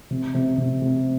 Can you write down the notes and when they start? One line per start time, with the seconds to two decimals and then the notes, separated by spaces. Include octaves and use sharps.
0.11 C3
0.34 C3
0.58 C3
0.82 C3